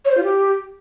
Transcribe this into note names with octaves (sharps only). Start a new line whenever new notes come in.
C#5
C5
F4
G4